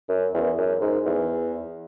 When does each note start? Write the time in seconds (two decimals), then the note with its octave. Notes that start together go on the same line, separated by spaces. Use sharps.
0.09 F#2
0.34 E2
0.58 F#2
0.81 G#2
1.06 E2